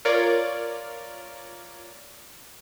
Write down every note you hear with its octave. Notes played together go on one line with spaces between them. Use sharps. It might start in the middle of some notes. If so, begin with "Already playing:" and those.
F4 A#4 C#5 D5